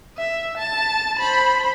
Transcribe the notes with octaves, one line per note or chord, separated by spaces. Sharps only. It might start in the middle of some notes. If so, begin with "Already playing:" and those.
E5
A5
C5 B5